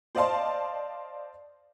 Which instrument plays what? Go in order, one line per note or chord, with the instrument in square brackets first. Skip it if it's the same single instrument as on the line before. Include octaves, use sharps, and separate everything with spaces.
[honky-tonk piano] C5 D5 D#5 F5 A5 C6